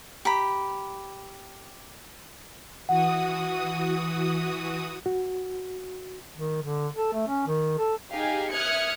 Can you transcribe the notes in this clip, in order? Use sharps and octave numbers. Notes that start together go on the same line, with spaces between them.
G4 A#5 B5
E3 F#4 F#5 D#6
F#4
D#3
D3
A4
A3
C#4
D#3
A4
D#4 G4 G#4 F5 G#5
E5 D#6 F6 F#6 G#6 C#7